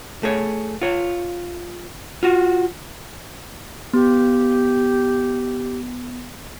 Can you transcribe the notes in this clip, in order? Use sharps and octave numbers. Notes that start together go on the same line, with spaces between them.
A3 G#4 C#5
F4 C#5
F4 F#4
B3 G4